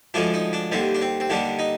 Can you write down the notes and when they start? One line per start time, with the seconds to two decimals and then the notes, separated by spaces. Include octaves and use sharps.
0.14 D2 D3 F3 G#3 D4
0.34 D#4
0.53 D4
0.72 D#2 D3 G3 C4
0.94 D4
1.02 C4
1.20 C4
1.30 D#2 D3 G3 D4
1.59 D#4